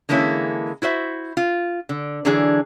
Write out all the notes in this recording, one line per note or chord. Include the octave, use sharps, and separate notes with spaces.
D3 E3 G#3 A#3 C#4 E4
E4 F#4 C5 E5
F4
D3
D3 E3 F#3 D4 G#4